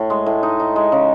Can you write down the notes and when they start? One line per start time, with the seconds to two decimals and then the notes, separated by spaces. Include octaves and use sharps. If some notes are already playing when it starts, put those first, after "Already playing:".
Already playing: A2
0.10 G#3
0.26 A2
0.43 D#4
0.60 D#4
0.76 G#3
0.92 C#3